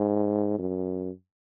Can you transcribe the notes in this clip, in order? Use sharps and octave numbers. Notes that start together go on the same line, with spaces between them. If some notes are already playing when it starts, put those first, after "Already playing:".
Already playing: G#2
F#2